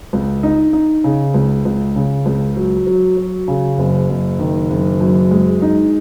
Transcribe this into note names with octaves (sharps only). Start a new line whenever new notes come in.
C#2
D#4
D#4
C#3
C#2
C#2
C#3
C#2
F#3
F#3
F#3
C#3
F#1
F#1
D#3
F#1
F#2
G#3
D#4